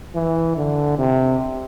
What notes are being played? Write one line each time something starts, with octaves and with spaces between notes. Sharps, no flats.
E3
D3
C3